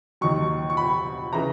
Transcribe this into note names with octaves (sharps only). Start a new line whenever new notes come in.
D#2 D#3 F#3 C#6
C#6
B5
C#3 E3 A#5